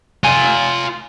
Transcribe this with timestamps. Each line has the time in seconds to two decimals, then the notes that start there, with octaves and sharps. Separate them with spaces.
0.24 F4 G#5